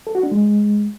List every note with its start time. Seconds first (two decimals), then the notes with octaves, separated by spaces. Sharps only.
0.07 A4
0.15 F#4
0.23 D4
0.32 G#3